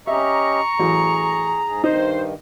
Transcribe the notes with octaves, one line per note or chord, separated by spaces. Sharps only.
C#4 G4 D#5 E5 A#5 C#6
A1 F#3 G#4
G#2 G#4
G2 D#3 D#4 C5